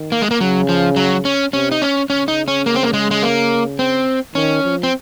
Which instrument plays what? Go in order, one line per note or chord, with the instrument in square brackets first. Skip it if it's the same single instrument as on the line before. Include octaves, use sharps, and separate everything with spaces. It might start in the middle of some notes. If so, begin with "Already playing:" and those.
Already playing: [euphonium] D#3
[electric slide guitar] A#3
G#3
A#3
[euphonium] C#3 [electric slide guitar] F#3
[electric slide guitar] F3
F#3
C#4
[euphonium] C3 [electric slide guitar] C#4
[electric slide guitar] D#4
C#4
[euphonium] C#3 [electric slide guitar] C#4
[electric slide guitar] D#4
C#4
A#3
C4
A#3
G#3
G#3
A#3
C4
[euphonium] D#3 [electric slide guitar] C#4
[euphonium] F3
[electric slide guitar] C4